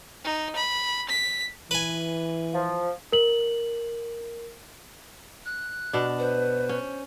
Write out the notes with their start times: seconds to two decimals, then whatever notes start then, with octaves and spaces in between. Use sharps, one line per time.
0.24 D#4
0.56 B5
1.09 B6
1.71 E3 B4 G#5
2.54 F3
3.12 A#4 F#7
5.46 F#6
5.93 B2 D4
6.19 B4 C5
6.69 C#4